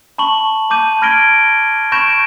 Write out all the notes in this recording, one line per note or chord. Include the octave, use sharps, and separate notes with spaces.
A5 B5 C#6 F#7
A5 D6 G6 D#7
B5 F6 G#6 A#6 D7 G7
B5 C#6 G6 A#6 D7 E7